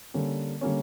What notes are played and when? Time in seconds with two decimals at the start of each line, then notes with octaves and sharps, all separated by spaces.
0.14 D3 G3 A#3 C#4
0.61 D3 G3 A#3 C#4